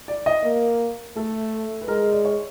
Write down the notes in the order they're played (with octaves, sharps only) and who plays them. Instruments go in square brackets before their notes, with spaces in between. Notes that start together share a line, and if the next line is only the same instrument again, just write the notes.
[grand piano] D5
D#5
[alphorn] A#3
[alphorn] A3 [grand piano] A4
[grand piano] B4
[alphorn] G#3 [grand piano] A#4
[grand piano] D5
C#5